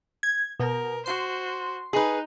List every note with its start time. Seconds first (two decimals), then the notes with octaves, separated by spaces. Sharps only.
0.23 G#6
0.60 B2 A#4
1.06 F#4 C5 C6
1.93 D#4 G#4 B4